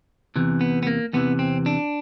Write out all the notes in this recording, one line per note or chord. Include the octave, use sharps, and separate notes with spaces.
E2 C3 E3
B3
B3
A#3
E2 C3 E3 B3
C4
D4